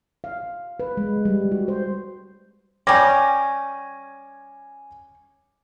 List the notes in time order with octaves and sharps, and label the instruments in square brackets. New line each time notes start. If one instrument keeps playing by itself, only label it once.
[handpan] F5
B4
G#3
G3
F#4
C5
[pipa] G3 C#4 [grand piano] G#5 D6 A#6